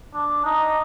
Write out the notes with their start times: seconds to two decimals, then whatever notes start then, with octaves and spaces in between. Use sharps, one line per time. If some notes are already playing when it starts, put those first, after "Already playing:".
0.14 D4
0.44 D#4